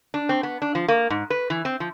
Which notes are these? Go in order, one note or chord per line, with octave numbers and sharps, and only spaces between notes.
D4
C4
B3
D4
F3
A#3
G#2
B4
E3
C4
F3